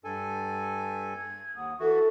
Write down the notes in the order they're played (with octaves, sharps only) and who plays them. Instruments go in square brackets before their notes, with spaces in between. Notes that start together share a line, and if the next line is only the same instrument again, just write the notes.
[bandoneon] G2 A4 G#5
[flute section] G#6
[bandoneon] D#2 [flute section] F#5 D#6
[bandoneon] E3 F#4 [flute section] A4 E5 C#6